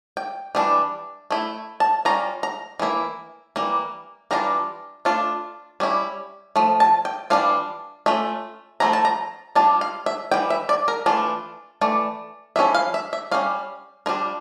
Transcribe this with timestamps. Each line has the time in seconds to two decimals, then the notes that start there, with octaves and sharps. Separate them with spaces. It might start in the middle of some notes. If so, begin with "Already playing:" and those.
0.17 G5
0.55 E3 G3 D4
1.31 A3 E4
1.80 A5
2.05 G3 C#4 F4 A#5
2.43 A#5
2.79 E3 A#3 E4
3.56 E3 G3 A#3
4.31 E3 G3 D4 F4 A#5
5.05 A3 D4 F4
5.80 G3 C#4 E4
6.56 F3 A3
6.80 A5
7.05 G5
7.30 E3 G3 D4 F4 F5
8.06 A3 C#4 F4 E5
8.80 F3 A3 E4 A#5
8.93 A5
9.05 A#5
9.55 G3 D4 F4 A5
9.81 F5
10.06 E5
10.31 E3 G3 G5
10.50 E5
10.69 D5
10.88 A#4
11.06 E3 A3 D4 F4
11.81 E3 A3 D5
12.56 F3 C#4 E4 E5
12.75 F5
12.94 E5
13.13 E5
13.31 G3 C#4 F4 F5
14.06 G3 D4 F4 A#4